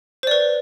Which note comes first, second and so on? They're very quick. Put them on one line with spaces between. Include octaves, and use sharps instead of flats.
C5 D5 B4